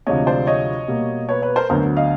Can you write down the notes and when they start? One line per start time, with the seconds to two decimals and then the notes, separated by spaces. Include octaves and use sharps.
0.06 D2 C3 F3 G#3 C#5 D#5
0.27 C5 D5
0.47 C#5 D#5
0.88 B2 G3 A#3
1.29 B4 C#5
1.42 B4 C#5
1.56 A#4 C5
1.70 D2 D3 F#3 B3 A#4 C5
1.97 D#5 F5